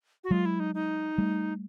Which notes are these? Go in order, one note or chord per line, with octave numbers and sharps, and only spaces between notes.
F#4
F#3 G#3 F4
E4
D#4
D#4
G3 A3